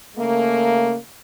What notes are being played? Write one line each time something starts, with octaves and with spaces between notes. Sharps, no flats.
C#3 A3 A#3